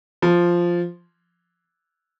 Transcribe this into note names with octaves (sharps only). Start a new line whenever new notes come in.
F3